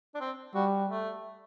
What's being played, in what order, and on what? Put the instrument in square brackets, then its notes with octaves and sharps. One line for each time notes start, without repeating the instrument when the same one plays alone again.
[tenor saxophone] D4
C4
[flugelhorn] G3 [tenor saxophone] F#4
[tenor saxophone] A3